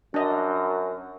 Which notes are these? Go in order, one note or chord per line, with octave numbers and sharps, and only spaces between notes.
F#2 D4 D#5